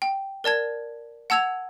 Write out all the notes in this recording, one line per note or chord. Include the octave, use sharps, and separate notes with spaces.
G5
A#4 D5 A5 G#6
F#5 A5 E6 G#6 F7